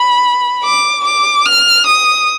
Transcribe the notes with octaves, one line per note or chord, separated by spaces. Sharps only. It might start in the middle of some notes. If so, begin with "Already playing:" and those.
Already playing: B5
D6
D6
F6
D#6